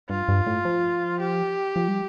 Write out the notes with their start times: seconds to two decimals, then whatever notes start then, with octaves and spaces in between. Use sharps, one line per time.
0.09 G2 F4
0.28 G2
0.46 A2
0.65 F3
1.20 G4
1.76 F3
1.88 G3